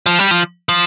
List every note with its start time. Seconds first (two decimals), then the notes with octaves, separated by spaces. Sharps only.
0.06 F3
0.19 G3
0.31 F3
0.69 F3